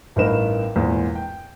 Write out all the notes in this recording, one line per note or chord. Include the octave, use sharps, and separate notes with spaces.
A1 G2 D#4 A#4 B4 E7
G#1 E2 A#2
G5